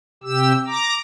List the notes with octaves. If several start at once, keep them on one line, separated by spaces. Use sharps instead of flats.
C3 G4 E6
A#5 D6